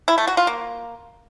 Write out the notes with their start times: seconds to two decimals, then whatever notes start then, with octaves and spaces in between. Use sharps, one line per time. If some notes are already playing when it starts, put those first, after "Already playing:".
0.08 E4
0.18 A3
0.27 F#4
0.37 F4
0.47 A#3